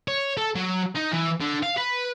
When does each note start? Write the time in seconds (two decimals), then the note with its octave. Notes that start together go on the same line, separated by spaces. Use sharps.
0.08 C#5
0.38 A4
0.56 F#3
0.96 D#4
1.12 E3
1.41 D3
1.63 F5
1.77 B4